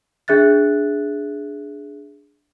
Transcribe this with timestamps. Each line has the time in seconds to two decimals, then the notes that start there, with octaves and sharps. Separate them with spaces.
0.28 D4 G#4 E5 F#6 A6